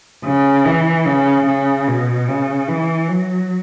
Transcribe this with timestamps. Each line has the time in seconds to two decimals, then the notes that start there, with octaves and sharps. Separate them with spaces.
0.25 C#3
0.65 E3
1.06 C#3
1.46 C#3
1.87 B2
2.28 C#3
2.68 E3
3.09 F#3